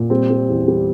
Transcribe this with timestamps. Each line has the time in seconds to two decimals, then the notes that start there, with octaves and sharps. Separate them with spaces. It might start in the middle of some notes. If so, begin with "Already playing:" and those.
Already playing: A#2
0.10 G3 C4
0.30 G3
0.49 E2
0.68 G3